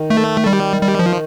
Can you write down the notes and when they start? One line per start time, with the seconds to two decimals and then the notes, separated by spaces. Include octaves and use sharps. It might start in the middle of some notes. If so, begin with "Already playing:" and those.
Already playing: D#3
0.10 A3
0.46 G3
0.81 G3
0.99 F3